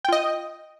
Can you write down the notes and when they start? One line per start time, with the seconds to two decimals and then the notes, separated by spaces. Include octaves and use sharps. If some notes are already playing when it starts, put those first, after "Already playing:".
0.05 G5
0.09 F4
0.12 D#5